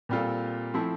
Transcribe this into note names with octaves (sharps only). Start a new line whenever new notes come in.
A#2 G3 C4 F4 A4
F3 A3 C4 E4